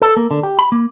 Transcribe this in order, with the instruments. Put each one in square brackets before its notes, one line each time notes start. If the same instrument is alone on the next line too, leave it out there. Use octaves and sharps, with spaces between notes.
[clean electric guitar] A4
A#3
D3
G4
B5
A#3